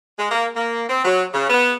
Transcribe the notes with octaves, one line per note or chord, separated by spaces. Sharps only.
G#3
A#3
A#3
C4
F#3
C#3
B3